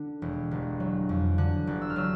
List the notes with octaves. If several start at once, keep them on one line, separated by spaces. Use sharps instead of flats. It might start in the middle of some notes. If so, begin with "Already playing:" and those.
Already playing: D3
E1
G1
F#3
F2
D3 F#6
G1
E6
F6
F#3 E6